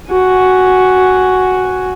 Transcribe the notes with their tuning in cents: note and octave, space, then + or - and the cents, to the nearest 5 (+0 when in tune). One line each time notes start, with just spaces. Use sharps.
F#4 +0 G#5 +0